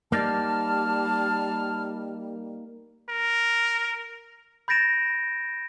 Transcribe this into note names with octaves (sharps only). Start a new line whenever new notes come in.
G3 A#3 D#4 D5 A5 F6
A#4
B5 G6 A6 A#6 D7 E7